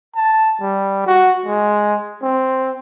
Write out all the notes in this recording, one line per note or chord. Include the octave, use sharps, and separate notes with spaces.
A5
G3
F#4
G#3
C4